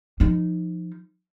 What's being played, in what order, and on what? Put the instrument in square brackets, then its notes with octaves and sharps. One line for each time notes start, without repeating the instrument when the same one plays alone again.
[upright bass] F3 D#4